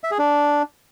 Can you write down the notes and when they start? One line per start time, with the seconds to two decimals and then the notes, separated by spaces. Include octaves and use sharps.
0.04 E5
0.11 G#4
0.19 D4